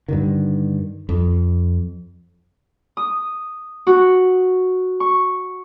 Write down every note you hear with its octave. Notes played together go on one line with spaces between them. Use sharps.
G2 D3 D#3
F2
D#6
F#4
C#6